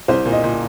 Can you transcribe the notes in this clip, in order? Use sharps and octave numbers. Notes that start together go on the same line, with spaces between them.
C2 C5
A#2
D#5
A#2